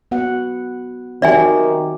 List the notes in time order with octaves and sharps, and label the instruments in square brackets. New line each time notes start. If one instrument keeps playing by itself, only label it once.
[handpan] B3 F#4 F#5
[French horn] D#3 [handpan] C4 F#4 G4 [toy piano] D5 E5 G#5